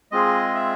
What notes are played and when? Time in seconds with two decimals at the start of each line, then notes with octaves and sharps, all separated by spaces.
0.12 G#3 C4 F4 G#4 D#5
0.54 E5